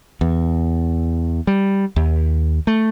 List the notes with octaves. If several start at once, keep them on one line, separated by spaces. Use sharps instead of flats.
E2
G3
D#2
A3